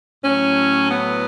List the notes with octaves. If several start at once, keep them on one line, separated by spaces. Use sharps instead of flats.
A2 F#3 C#4
B3